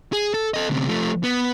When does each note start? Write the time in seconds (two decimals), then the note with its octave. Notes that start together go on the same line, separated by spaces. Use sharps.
0.13 G#4
0.34 A4
0.54 A4 D#5
0.70 D2 C3
0.87 F3 A3
1.24 B3